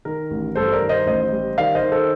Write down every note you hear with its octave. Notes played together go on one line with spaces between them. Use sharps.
D#3 A#4
A1
G2 A4 C5
A#4 D5
D#3
C5 D#5
A1 C5 D#5
G3
D#3 D5 F5
C5 D#5
D#3
A4 C5